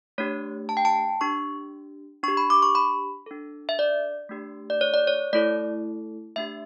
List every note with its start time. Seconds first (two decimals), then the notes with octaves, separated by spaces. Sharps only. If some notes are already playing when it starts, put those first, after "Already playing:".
0.18 A3 D4 G4 C#5
0.69 A5
0.77 G5
0.85 A5
1.21 D4 G4 C#6
2.23 D4 C#6
2.28 G4
2.37 B5
2.50 D6
2.62 C#6
2.75 B5
3.26 D4 A4
3.69 E5
3.79 D5
4.29 A3 D4 G4
4.70 D5
4.81 C#5
4.94 D5
5.07 C#5
5.33 A3 E4 A4 D5
6.36 A3 D4 G4 E5